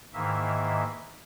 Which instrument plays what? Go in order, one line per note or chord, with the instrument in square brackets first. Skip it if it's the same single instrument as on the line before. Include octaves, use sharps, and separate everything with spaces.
[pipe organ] G#2 D#3 E3 A#3 E5